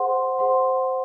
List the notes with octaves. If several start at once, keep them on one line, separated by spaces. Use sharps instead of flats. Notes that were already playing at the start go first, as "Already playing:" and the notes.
Already playing: G#4 C5 F#5 C6
G#4 C5 F#5 C6